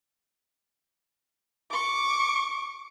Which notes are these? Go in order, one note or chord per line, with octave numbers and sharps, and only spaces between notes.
C#6 D6